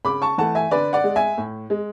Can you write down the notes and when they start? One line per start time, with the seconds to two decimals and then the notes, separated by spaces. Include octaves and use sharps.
0.05 C#3 B5 D6
0.22 A5 C#6
0.38 E3 A3 F#5 A5
0.55 E5 G#5
0.71 D3 B4 D5
0.93 D5 F#5
1.04 G#3
1.16 E5 G#5
1.38 A2
1.70 G#3